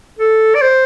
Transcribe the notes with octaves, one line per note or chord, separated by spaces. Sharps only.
A4
D5
C5